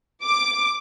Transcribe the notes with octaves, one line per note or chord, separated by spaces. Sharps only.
D6